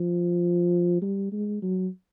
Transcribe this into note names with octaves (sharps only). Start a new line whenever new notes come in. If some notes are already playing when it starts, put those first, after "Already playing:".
Already playing: F3
G3
G#3
F#3